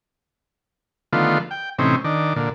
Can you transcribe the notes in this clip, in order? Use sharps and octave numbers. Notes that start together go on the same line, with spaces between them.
D3 D#3 F3 A3 B3 F4
G5
A2 C3 E3 C4 C#4 D#4
D#3 D4
A#2 D3